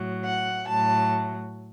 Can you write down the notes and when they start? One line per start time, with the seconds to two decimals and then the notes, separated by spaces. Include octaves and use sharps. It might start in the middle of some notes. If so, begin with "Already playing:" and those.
Already playing: A2 F#3
0.24 F#5
0.67 A2 F#3 A5